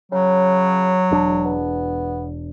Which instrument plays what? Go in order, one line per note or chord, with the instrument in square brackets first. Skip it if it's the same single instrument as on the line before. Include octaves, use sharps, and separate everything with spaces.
[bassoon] C#3 [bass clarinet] F#3
[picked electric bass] E1 D4
[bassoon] B3